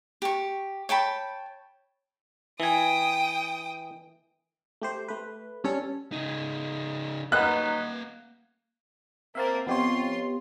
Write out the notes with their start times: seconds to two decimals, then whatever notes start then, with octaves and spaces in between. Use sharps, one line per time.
0.22 G4 C#6
0.89 C#5 G5 A5 B5
2.60 E3 G5 G#5 D#6
4.82 A3 G4 C5
5.08 A3 B4
5.64 G3 C#4 A4 C#5
6.12 C#3 D#4
7.32 F#3 A#3 D#4 B4 F#5 F#6
9.35 A#3 C4 A#4 E5 F5 A5
9.67 F2 B3 F4 G4 C#5 C6